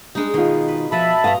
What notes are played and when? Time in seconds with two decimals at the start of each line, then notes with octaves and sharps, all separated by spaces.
0.15 G3 G#3 D4 D#4
0.34 B2 D#3 F4
0.68 B4
0.92 F3 B4 E5 F#5 A5 B5
1.24 G2 D#5 F5 A#5